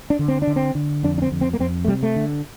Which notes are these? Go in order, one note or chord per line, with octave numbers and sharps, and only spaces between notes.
D4
D3
C4
D4
D3
C4
D3
F2 D4
D4
C4
F2
C4
A#3
F2 C4
A3
C3 G3
A3
D3